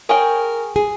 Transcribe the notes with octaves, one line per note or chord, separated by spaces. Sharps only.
G#4 A#4 C#5 G5
G#4